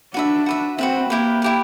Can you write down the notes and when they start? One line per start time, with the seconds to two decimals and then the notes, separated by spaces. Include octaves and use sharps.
0.14 D4 F#4 B4 E5
0.46 F#4 B4 E5
0.78 C4 F#4 B4 E5
1.10 A#3 E4 G4 B4
1.42 E4 G4 B4